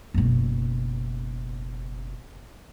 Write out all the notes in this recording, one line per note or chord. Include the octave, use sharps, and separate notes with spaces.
F#1 B2